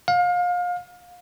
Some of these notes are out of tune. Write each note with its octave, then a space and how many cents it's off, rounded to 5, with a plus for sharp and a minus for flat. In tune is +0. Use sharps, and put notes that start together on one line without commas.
F5 +30